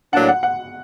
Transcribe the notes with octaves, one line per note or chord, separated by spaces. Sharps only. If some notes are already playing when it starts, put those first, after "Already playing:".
A2 F#3 A#3 D4 F#5
F#5
F#5